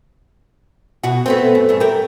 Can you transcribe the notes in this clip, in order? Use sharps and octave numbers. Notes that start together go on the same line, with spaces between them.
B2 F#4
A3 B3 C4
F#2
G2 A3
G4 A#4